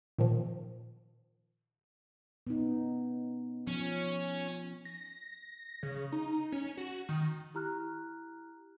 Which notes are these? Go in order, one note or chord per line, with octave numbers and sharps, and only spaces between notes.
A#2 D#3 F3
B3 C#4 D#4
F3 C#4
A#6
C#3
D#4
C#4
F#4
D#3
E4 G4 A#5 F6 F#6